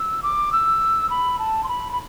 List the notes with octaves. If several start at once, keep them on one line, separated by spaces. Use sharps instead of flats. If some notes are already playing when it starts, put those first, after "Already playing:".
Already playing: E6
D6
E6
B5
A5
C6
B5
B5